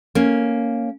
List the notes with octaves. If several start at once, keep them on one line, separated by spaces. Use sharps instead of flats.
A#3 C#4